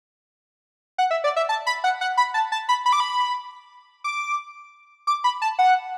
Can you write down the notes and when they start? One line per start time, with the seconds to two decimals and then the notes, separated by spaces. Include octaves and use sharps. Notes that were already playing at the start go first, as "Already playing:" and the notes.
0.98 F#5
1.11 E5
1.24 D5
1.36 E5
1.49 A5
1.67 B5
1.84 F#5
2.01 F#5
2.17 B5
2.34 A5
2.52 A5
2.69 B5
2.86 B5
2.93 D6
3.00 B5
4.04 D6
5.07 D6
5.24 B5
5.42 A5
5.59 F#5